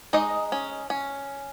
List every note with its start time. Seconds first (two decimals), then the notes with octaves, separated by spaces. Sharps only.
0.13 G#3 D#4 D#5
0.52 C#4
0.90 C#4